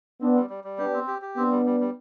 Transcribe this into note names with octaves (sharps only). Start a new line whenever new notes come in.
B3 C4 D4
G3
G3
G3
B3 D4 G4
C4
G4
G4
B3 C4 D4
G3
G3
G3